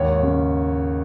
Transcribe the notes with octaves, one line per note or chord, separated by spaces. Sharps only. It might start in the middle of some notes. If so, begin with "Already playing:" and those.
Already playing: D#2 G#2 D#3 C#5
C#3